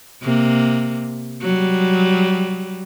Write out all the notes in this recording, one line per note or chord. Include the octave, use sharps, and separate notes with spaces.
C3 A#3
F#3 G3